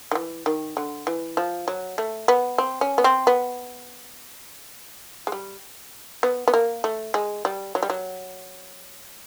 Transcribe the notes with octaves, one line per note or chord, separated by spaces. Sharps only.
D#3
E3
D#3
D3
E3
F3
F#3
A3
B3
C4
C#4
B3
C4
B3
G#3
G3
B3
B3
A#3
A3
G#3
G3
F#3
G3
F#3